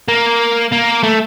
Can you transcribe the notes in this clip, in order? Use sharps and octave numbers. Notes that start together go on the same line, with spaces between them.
A#3
A#3
A3